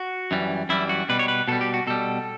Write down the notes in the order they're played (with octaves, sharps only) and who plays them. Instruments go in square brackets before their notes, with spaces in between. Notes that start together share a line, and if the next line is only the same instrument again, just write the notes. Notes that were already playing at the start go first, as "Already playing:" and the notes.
Already playing: [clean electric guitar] F#4
F#2 E3 G3
F#2 E3 G3 E4
F#4
B2 G3 B4
C#5
B4
B2 G3 A4
G4
F#4
B2 G3 A4